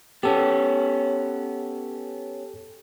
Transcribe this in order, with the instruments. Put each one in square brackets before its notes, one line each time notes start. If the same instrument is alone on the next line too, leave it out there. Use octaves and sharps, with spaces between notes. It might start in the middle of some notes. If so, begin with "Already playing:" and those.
[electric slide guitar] B3 C#4 [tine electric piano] G4 A4